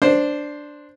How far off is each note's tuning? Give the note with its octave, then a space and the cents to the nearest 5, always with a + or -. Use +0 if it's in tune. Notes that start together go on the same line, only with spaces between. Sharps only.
D4 +0 C5 +0